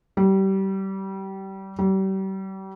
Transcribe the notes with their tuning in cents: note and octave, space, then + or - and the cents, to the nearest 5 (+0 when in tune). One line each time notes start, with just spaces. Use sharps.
G3 -25
G3 -35